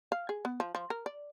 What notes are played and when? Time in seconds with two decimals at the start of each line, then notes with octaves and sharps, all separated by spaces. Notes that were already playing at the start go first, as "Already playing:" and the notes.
0.12 F5
0.29 G#4
0.45 B3
0.60 F3
0.75 F3
0.90 A#4
1.06 D5